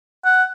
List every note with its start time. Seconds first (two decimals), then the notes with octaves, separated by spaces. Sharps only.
0.25 F#5